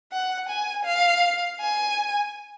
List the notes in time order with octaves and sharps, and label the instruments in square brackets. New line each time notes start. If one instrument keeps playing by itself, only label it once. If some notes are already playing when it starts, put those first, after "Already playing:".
[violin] F#5
G#5
F5
G#5